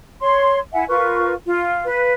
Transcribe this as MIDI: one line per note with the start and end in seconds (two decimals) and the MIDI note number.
0.21 0.58 73
0.21 0.58 84
0.72 0.84 64
0.72 0.84 76
0.72 0.84 78
0.72 0.84 80
0.89 1.33 65
0.89 1.33 70
0.89 1.33 71
0.89 1.33 85
1.45 1.84 65
1.85 2.13 71
1.85 2.13 77